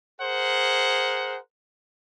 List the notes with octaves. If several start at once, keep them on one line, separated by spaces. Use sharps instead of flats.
G#4 A#4 C5 F#5